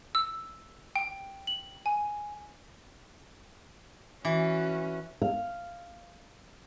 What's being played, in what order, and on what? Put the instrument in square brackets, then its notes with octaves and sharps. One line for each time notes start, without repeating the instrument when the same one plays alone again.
[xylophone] E6
G5
F#7
G#5
[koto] E3 [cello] C#4 F#4
[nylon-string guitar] F5